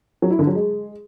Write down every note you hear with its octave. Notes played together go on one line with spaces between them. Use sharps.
F#3
E4
D3
F#3
G#3